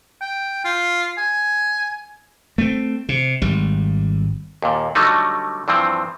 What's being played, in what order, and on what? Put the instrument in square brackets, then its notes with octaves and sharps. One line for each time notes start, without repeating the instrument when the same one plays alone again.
[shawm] G5
F4
G#5
[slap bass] A3 C4
C3
G#1 G3
[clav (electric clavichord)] D#2 A#2
D3 F#3 G3 A3 D#4
G2 E3 F3 C4